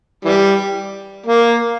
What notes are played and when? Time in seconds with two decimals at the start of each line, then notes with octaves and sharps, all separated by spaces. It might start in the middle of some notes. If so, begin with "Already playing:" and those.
0.25 E3 G3
1.26 A#3